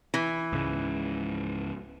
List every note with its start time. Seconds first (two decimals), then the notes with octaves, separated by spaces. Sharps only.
0.14 E3
0.53 C#2 G#2 C#3